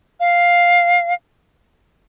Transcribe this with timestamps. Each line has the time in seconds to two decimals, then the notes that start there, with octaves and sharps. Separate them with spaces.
0.20 F5